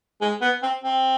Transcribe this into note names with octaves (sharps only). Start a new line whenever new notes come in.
G#3
B3
C4
C4